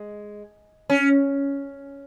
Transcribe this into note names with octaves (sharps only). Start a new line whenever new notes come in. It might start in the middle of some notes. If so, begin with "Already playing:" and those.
Already playing: G#3
C#4